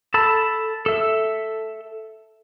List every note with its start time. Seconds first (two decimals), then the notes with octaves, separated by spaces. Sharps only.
0.14 A4 A5 B5 E6
0.86 A4 E5